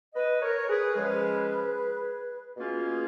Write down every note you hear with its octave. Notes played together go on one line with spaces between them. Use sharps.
B4 D#5
A#4 C#5
C#5
G#4 B4
C#3 F3 G#3 C#4 G#4 B4
B2 A#3 C#4 F4 G#4